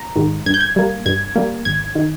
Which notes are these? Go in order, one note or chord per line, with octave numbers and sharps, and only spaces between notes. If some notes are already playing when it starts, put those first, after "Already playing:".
Already playing: A#5
G#2 D#3
G2 G#6
G6
G#6
G3 A#3
G2 G#6
G3 A#3
G#1 G#6
D#3